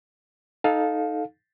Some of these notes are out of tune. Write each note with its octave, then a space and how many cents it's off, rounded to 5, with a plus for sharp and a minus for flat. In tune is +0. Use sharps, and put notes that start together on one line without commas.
D#4 +0 A4 -10 F5 +20